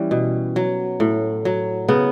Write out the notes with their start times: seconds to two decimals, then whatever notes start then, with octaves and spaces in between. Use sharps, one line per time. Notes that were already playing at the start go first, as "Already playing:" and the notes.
Already playing: E3 G3 C#4
0.11 B2
0.56 F#3
1.00 A2
1.45 F#3
1.88 C#3 B3